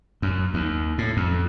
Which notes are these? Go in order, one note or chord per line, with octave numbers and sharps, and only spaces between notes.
F#2
D#2
A2
F2